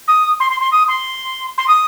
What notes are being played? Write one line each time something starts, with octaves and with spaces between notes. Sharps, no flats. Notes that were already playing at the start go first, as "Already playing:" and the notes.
D#6
C6
C6
C6
D#6
C6
C6
D#6